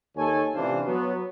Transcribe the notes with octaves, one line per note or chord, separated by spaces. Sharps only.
D#2 D#3 A4 C#5 G#5
A1 C3 E3 D4 F4 C5
F#3 B3